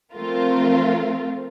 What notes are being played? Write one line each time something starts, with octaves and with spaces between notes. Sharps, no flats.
F3 A3 C4 F4 A#4